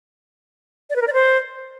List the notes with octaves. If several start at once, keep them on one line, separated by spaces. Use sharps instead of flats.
D5
B4
A#4
D5
C5